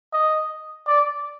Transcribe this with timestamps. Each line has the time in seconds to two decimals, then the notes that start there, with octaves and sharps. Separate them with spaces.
0.13 D#5
0.87 D5